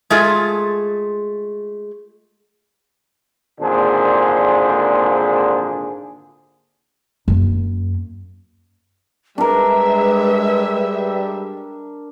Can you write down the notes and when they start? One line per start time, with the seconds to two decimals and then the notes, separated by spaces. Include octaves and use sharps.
0.10 G#3 A3 F4 G#4
3.60 G#1 A#2 D3 D4 G#4 C5
7.28 F#2 A#3
9.38 G3 G#3 D4 A#4 B4 E5